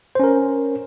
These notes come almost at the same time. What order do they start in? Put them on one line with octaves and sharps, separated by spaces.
C5 C#4 A#4